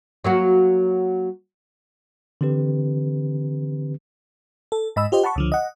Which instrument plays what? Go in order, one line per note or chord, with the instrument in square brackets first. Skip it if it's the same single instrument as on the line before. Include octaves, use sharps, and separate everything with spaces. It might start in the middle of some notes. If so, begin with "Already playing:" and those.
[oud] F#3 A#3 F#4
[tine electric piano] D3 E3 C4 G4 B4
[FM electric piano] A4
G#2 D#5 B5 E6
F4 G4 C5 D#5
F#5 A5 B5 C#6
C#2 D3 F3
D#5 F#5